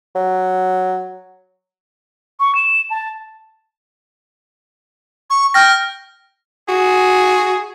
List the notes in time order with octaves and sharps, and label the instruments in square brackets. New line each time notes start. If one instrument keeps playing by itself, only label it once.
[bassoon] F#3
[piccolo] C#6
E7
A5
[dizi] C#6
[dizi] G5 [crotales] F6 A#6
[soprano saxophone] F#4 [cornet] G#4